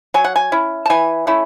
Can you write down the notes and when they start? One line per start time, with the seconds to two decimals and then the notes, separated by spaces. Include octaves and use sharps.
0.14 F#3 G#5
0.24 F#5
0.36 G#5
0.52 C#4 E4
0.86 A5
0.90 E3 G#5
1.27 A3 C#4 E4